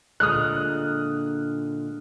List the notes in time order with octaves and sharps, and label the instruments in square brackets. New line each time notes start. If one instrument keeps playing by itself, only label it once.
[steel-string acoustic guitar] A#2 D3 G#3 [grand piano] D#6 F6 F#6